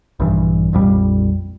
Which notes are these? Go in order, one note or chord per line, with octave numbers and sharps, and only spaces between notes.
A#1 G2 E3
A#1 F2 G3